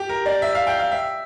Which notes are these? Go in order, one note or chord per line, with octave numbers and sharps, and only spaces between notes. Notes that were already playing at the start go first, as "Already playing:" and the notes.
Already playing: G4
A#4
D5
E5
F5
G5
F5
E5